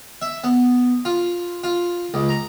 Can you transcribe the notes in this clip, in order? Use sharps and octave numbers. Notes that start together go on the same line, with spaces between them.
E5
B3
F4
F4
C#2
A#5